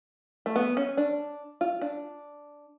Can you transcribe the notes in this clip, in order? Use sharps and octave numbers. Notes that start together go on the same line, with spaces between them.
A3
B3
C#4
D4
F4
D4